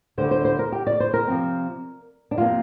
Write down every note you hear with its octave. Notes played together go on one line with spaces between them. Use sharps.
D2 D3 G3 C5
C5
C5
A#4
G4
D5
C5
A#4
C3 F3 C4
D4
F2 C3 A#3 F4